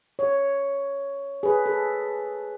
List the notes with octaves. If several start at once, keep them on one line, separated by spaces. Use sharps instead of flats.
C#5
G#4 B4
A4